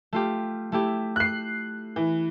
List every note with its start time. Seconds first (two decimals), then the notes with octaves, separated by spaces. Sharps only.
0.13 A3 F4 G4
0.72 A3 E4 G4
1.16 F#6 C7
1.96 E3